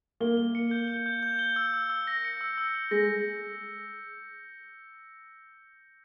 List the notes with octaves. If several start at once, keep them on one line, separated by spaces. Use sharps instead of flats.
A#3 G7
G7
C#7
G6
G7
G6
G6
G7
E6
E6
E6
A#6
C#7
E6
E6
E6
G#3 A#6